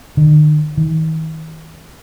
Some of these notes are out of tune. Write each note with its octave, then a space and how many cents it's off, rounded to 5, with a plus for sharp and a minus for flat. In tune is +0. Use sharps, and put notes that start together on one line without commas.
D#3 -45
D#3 +40